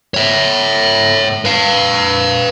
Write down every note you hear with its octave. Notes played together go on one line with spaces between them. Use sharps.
C#5 E5
B4 F5